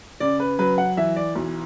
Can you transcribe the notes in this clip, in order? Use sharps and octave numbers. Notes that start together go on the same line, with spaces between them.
C#3 D5
B4
F#3 B4
F#5
E3 E5
D5
B1